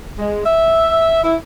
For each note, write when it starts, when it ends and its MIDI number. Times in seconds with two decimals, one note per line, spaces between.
0.18 0.45 56
0.45 1.20 76
1.24 1.36 64